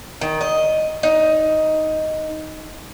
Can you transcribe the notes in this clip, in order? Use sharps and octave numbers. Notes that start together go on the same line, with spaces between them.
D#3
D#5
D#4